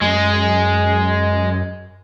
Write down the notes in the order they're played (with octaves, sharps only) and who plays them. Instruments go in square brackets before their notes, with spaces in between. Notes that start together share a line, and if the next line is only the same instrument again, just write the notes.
[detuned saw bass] F#2 [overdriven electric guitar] G#3